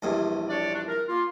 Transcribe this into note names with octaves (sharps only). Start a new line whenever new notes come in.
A#1 E2 G2
D4 C#5 D5
D4
A#4
A#3 F4